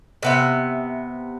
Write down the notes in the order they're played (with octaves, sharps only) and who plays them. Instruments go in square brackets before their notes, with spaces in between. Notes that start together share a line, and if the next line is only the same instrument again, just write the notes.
[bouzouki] C3 B3 E5